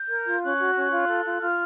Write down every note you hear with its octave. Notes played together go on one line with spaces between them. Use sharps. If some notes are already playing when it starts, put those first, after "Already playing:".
Already playing: G6
A#4
F4
C#4 F#6
F#4
C#4
F4
A4
F4
F4 F6